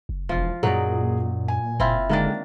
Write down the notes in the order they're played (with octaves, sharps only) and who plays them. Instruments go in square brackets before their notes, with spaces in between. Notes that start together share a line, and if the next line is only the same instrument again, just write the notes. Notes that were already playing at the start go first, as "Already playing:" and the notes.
[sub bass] F#1
[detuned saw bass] E1 [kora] F3 F4
[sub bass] F#2 [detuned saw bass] A#2 [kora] F#3 D#4 D5 [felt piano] G#4
[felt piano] G#5
[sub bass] F#1 [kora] C4 E4 F4
[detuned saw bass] D3 [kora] D#3 A#3 D4 [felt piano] G#3 A6